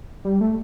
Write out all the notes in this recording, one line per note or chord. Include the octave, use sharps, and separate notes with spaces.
G3
A3